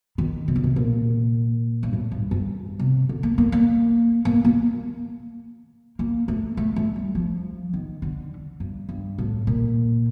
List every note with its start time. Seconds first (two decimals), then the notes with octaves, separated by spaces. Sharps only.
0.18 D#3
0.48 C3
0.56 D3
0.64 C3
0.76 A#2
1.83 G2
1.93 A2
2.11 G2
2.31 G2
2.79 C3
3.09 D3
3.23 A#3
3.38 A#3
3.52 A#3
4.25 A#3
4.45 A#3
5.99 A#3
6.28 A3
6.57 A3
6.76 A3
6.96 G3
7.15 F3
7.73 D#3
8.02 D3
8.60 G2
8.89 G2
9.18 A2
9.47 A#2